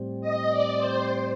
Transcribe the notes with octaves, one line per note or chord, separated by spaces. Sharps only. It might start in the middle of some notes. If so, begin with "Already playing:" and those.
Already playing: A2 G3 C4
D#5
D5
C5